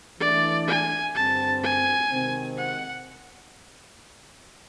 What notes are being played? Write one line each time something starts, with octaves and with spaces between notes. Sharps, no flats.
E3 A3 D4 D5
G#5
G2 D3 G3 C4 A5
G#5
C3 D#3 G#3 C4
F#5